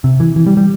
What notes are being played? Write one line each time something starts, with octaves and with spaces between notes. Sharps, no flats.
C3
E3
E3
G3
G3